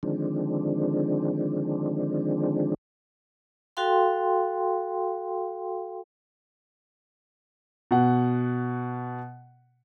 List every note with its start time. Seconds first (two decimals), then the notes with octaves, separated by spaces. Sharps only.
0.03 D3 D#3 F3 G#3 C4 D4
3.77 F#4 A4 F5 G5 C6
7.91 B2 F#5